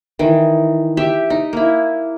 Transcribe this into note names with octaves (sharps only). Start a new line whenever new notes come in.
D#3 E3
G4 E5
D#4
A#3 E4